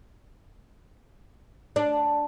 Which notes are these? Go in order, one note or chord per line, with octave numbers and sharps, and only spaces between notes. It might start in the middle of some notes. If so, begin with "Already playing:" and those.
D4